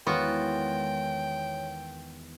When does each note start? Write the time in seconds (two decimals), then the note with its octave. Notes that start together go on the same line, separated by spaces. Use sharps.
0.07 E2 D#3 G#3 B3 F4 F#4 C#5 G5